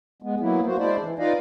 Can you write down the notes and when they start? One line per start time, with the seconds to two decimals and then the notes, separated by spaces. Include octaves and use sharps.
0.22 G#3 B3
0.40 F#3 A#3 B3 E4
0.66 A#3 F#4 C5
0.78 G#3 D4 E4 C5 D5
1.01 E3
1.19 D#4 F4 B4 D5 D#5 F5